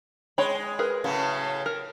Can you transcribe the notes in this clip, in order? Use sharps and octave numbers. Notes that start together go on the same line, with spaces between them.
G#3 C#5 G5 B5
G#4 A#4 B4
A2 C#3 F#3
A#4